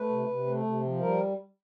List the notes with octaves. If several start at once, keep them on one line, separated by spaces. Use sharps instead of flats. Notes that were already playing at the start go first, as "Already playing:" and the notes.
Already playing: A3 B4
C3
C3
A3
C3
F3
G3 A#4